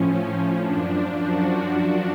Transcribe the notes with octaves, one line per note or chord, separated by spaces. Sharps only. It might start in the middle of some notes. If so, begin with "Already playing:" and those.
Already playing: A2 F3 C#4
F#2 F3 D4
F#4